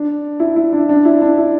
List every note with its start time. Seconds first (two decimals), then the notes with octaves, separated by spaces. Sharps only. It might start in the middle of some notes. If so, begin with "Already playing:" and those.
Already playing: D4
0.40 E4
0.56 E4
0.73 D4
0.89 D4
1.05 E4
1.22 D4
1.37 E4